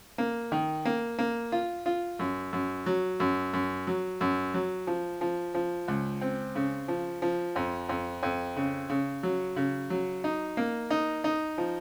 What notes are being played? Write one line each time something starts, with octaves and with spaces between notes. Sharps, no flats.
A#3
D#3
A#3
A#3
F4
F4
F#2
F#2
F#3
F#2
F#2
F#3
F#2
F#3
F3
F3
F3
C#2
C4
C#3
F3
F3
F2
F2
F2
C#3
C#3
F#3
C#3
F#3
D#4
A#3
D#4
D#4
F3